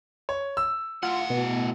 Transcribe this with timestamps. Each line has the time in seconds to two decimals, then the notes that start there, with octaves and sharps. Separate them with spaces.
0.29 C#5
0.57 E6
1.03 A2 F4 F#5
1.30 B2